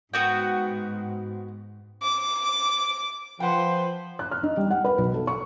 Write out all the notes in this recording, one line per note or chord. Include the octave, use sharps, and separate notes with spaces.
G#2 B3 F#4 G5
D6
F3 B4 C5 F#5 G5
F#6
F6
D#4
G3
F#5
B4
B1
A4
C#6